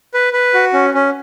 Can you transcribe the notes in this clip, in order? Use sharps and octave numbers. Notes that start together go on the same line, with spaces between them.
B4
B4
F#4
C#4
C#4